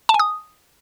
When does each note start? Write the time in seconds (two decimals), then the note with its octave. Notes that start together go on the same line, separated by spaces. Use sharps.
0.09 A5
0.14 G#5
0.19 D#6